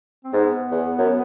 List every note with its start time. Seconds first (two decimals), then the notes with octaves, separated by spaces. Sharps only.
0.25 C4
0.33 G#2 B3
0.71 E2
0.98 F#2